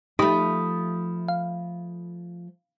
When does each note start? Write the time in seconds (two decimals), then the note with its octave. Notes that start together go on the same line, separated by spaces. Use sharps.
0.19 F3 A3 D#4 G4 B5 D#6
1.28 F5